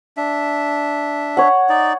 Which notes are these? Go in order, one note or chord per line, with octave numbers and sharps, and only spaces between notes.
D4 E5
C#5 F#5
D#4 D5